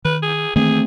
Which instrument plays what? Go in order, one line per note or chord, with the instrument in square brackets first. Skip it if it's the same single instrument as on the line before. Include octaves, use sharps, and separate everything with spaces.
[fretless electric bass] D#3 [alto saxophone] B4
[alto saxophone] G#4
[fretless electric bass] D#3 E3 A#3 [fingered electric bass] A3 C4 [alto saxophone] G#4